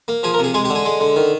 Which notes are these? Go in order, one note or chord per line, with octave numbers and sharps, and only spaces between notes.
A#3
F3 G#4
A#4
C3 G#4
G#3 G#4
G4
D3
G#4
G#3
D3
D#3